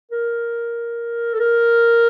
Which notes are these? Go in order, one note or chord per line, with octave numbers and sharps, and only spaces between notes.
A#4
A4
A#4